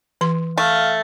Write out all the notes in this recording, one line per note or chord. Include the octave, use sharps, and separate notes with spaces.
E3 C6
A3 F5